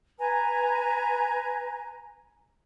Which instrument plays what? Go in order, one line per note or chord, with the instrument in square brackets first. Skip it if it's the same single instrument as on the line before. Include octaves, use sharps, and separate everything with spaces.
[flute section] B4 G#5 A#5